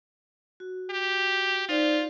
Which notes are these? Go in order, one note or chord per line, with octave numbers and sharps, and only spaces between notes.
F#4
G4
D#4 F4 C5 D5